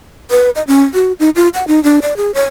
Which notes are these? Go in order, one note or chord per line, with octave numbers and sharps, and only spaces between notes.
B4
D#5
C#4
F#4
D#4
F4
F#5
D#4
D4
D5
G#4
C#5